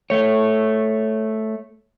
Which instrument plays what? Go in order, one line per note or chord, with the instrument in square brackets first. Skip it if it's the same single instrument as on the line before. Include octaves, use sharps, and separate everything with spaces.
[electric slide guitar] A3 C#5